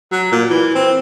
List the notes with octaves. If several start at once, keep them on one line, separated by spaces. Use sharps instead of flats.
F#3
A#2
E3
C4